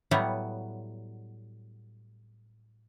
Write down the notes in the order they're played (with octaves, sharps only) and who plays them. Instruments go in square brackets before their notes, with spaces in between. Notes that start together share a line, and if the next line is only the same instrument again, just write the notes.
[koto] A2 F#3 G3 B3